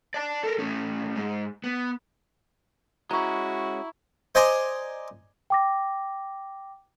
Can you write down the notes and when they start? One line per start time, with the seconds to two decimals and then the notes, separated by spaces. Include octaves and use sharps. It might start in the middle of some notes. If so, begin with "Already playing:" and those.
0.14 D5 A5
0.43 A4 A#4
0.58 A2 C#4
1.16 G#2
1.64 B3
3.11 G#3 C#4 E4 F#4 A#5 C#6
4.35 C5 D5 D#5 G#5 A#5 C6
5.50 G5 D6 A#6